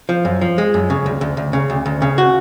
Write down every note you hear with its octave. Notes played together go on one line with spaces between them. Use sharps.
F3
F#2
F3
G#3
F#2
C#3
D2
D2
D2
C#3
D2
D2
C#3
F#4